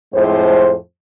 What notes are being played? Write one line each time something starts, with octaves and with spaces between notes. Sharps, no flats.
F2 A2 G#3 C5